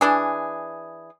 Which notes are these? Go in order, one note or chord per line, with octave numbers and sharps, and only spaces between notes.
E3 D4 G#4